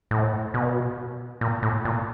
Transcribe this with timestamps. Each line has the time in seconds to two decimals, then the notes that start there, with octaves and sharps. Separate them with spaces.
0.11 A2
0.54 B2
1.41 A#2
1.63 A2
1.85 A#2